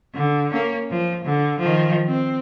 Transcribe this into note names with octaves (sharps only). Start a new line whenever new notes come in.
D3
A#3 C#4
F3
D3
D#3 F3
C4